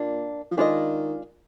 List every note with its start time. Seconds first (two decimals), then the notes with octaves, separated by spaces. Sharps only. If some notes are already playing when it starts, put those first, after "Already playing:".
Already playing: A#2 A#3 D4
0.51 F3
0.57 D#3 G#3 D4 F4 C5 D#5